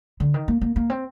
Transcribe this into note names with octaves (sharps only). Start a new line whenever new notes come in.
D3
D#3
A#3
A#3
A#3
C4